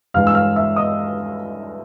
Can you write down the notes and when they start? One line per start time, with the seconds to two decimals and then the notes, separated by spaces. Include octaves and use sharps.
0.14 G2 E3 G#3 F5 F6
0.27 E6
0.35 F5 F6
0.56 E5 E6
0.76 D#5 D#6